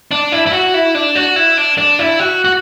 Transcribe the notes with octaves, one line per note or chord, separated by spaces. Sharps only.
D4
E4
E4
F#4
E4
D4
F#4
E4
D4
D4
E4
F#4
F#4